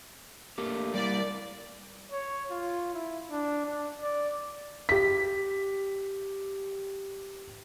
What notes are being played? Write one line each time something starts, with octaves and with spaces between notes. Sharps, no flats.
A3 A#3 D4 G4
G3 E4 D5
C#5
F4
E4
D4
D4
D5
G4 B6